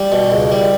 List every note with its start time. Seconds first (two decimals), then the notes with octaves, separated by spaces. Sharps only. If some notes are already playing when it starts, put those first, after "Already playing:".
Already playing: G3
0.12 B2
0.32 C#2
0.51 G3